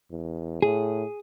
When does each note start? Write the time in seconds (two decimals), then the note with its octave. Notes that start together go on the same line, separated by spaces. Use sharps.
0.11 E2
0.62 A2 G#4